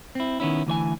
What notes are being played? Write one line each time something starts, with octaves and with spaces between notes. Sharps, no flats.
C4 E4
D#3 B3 C#4 E4
D2 E3 C#5 G#5